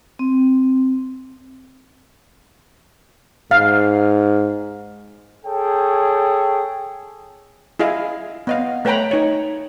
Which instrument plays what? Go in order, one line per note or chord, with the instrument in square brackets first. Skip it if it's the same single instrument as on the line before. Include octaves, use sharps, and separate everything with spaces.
[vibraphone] C4
[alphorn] G#2 [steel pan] F5
[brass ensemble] G#4 A4 C#5 G5
[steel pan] E4 G#4 D#5 F5
B3 D#5 F5
A3 B4 C#5 G5 A#5 B5
D#4 C#5